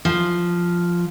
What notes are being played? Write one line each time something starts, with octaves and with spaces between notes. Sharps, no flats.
F3